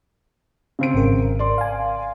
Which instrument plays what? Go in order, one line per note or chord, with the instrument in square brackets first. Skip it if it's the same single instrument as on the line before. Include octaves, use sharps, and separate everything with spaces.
[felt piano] C#3 C4 D7
[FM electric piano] G#1 A#4
[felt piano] D5 C6
[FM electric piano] F5 G#5